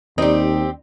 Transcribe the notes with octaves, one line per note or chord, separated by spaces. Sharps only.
D#2 C4 D#4 G4